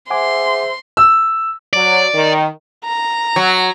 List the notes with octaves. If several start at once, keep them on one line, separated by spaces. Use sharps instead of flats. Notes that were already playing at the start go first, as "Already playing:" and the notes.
G#4 C5 E5 F#5 G#5 C6 D6
E6
F#3 D5
D#3
A#5
F#3